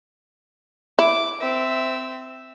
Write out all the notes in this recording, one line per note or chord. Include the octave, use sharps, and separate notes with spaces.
E4 D6
C4 E5